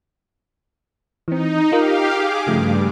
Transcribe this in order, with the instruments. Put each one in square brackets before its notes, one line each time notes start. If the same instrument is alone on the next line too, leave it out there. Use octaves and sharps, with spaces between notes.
[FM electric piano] E3 C4 [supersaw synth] D#4
[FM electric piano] D#4 F4 A#4 [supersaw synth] G4 F5
[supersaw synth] G#4 D6
[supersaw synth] G2 [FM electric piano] C#3 F3 A3